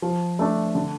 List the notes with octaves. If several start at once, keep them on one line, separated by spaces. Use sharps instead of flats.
F3
A3 D4
D3